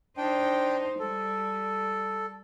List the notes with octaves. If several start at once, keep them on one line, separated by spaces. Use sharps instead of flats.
D4 D#4 C5 G5
G3 A4